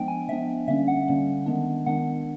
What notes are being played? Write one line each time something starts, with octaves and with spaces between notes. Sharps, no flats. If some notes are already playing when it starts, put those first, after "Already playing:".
Already playing: F3 G#3 B3 D4 G5
G#5
F3 G#3 B3 D4 E5
D3 G3 A#3 C#4 E5
F#5
D3 G3 A#3 C#4
D#3 G#3 B3 D4
D#3 G#3 B3 D4 F#5